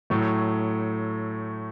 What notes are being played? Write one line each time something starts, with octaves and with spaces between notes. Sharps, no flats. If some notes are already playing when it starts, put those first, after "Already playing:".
A2 F#3 A3